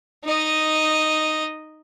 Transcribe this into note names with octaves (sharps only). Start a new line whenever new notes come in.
D#4 D#5